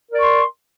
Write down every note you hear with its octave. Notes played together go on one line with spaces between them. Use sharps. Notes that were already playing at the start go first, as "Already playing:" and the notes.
A#4 D5 C6 C#6